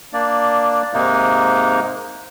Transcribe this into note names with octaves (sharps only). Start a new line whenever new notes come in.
A#3 D4 D5
G#2 C3 G#3 A#3 D#4